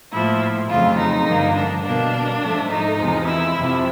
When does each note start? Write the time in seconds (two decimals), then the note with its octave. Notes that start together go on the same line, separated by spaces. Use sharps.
0.12 A2 F3 A#3 E4
0.69 F2 C#3 F#3 A3 F4
0.98 D#4
1.26 G2 D3 F3 A#3
1.55 D4
1.84 B2 G3 A#3 D4
2.41 G#2 F3 A3
2.70 D#4
2.98 E2 C3 F3 G#3
3.27 E4
3.55 F2 C3 F3